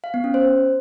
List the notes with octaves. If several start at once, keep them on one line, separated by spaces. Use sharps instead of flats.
F5
B3
C#4
C5